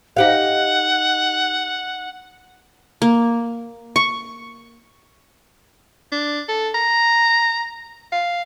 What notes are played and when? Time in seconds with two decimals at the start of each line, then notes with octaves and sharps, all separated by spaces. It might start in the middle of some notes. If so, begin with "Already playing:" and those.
0.17 D#4 G4 F5 F#5
3.02 A#3
3.96 C#6
6.12 D4
6.49 A4
6.75 A#5
8.12 F5